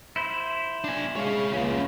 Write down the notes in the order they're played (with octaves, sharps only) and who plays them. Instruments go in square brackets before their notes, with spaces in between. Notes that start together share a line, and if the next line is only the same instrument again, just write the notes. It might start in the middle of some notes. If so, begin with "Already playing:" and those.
[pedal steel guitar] E4 C5
[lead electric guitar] D4 G#5
[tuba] G#3 [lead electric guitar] C#5 F5
[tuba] C#2 [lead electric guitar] A#3 C#4